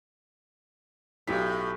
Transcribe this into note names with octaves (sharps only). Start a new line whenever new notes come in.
B1 A2 G4 B6